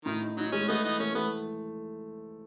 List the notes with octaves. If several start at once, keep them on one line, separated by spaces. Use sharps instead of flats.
A2 D#3
D#4
F#3 D#4
G#3 C#4
A3 B3 D#4
E3 B3 D#4
A3 C#4
A3 B3